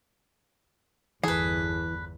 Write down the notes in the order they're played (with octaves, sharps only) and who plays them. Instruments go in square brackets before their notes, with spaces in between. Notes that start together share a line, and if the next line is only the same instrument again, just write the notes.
[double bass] G1 E2 [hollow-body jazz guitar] E3 [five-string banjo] G#4 [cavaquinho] A4 B4